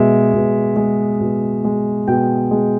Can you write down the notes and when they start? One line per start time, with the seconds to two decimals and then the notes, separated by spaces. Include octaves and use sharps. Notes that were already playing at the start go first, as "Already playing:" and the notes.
Already playing: B2 G#3 E5
0.34 B2
0.76 G#3
1.20 B2
1.64 G#3
2.08 B2 G5
2.51 G#3